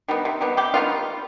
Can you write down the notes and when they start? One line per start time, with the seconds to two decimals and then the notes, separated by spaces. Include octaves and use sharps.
0.08 D#3 G3 B3
0.25 C3
0.41 D#3 G3 B3
0.57 C3 G4
0.74 D#3 G3 B3 F4